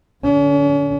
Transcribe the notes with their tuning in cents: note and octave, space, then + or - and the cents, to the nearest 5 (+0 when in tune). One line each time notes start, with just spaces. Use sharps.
D3 +0 C#4 +40